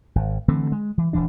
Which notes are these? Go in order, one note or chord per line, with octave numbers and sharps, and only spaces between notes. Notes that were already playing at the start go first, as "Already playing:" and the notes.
G#1
D3 E3 A3 C4
G#3
E3
D#1 D2 E3 D4